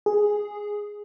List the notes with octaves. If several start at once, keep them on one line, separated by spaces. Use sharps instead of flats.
G#4